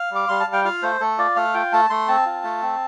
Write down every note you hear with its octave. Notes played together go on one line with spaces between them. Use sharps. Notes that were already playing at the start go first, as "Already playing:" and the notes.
Already playing: F5
G3 D6
G3 C6
A5
G3
G5
F4 F5
A3 C5
A3 A4
F4 D5
A3 F5
F4 G5
A3 A5
A3 C6
C4 A5
F4
A3
C4